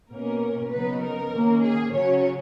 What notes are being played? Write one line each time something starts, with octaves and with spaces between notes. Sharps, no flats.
B2 A#3 C#4 A#4
C#3 F#3 B3 D#4 B4
A#4
D#3 A#3 C#4
G#4
C#3 F#3 C#4 C#5